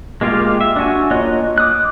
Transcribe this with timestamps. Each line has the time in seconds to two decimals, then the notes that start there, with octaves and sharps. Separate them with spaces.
0.21 G#3 A#3 F4 G4 F5
0.61 E5
0.76 D4 F#4 G#5
1.11 A#3 F4 C#5 D#5 F#6
1.58 D6 D#6 F#6